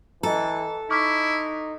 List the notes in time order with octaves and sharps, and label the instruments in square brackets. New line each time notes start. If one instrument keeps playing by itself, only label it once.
[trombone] E3 [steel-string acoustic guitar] A4 [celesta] D#5 A#5
[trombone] D#4 [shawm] E4 [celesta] C#6 D6 F6